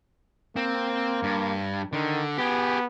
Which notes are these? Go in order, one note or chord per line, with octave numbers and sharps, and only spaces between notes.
A#3 C4
G2
D3 D#3
B3 G4 G#4